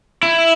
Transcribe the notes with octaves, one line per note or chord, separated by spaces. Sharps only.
E4